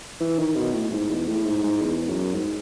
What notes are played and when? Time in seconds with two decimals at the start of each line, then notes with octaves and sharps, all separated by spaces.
0.21 E3
0.38 D#3
0.56 B2
0.74 A2
0.92 G#2
1.10 E2
1.28 A2
1.45 G#2
1.64 G#2
1.81 E2
2.08 F#2
2.34 G#2